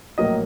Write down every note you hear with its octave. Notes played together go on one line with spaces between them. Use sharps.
A#1 A2 F#3 A#3 D#5